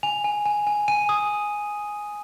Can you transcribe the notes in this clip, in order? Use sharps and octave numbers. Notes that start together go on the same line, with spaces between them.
G#5 F7
G#5
G#5
G#5
G#5 D#7
D#6